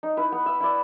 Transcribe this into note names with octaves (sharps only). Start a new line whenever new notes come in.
D#4
E4 B4
B3
E5
E4 D5